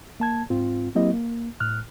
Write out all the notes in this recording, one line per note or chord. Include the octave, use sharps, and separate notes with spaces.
A#3 A5 G#6
G#2 C4 F4
F#3 A#3 C4 E4 G4 D#5
A#3
A2 F6 F#6